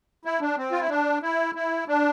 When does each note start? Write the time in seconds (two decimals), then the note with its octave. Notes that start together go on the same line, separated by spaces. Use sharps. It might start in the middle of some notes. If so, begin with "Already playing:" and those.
0.25 E4
0.41 D4
0.58 C4
0.72 F4
0.81 E4
0.89 D4
1.22 E4
1.55 E4
1.88 D4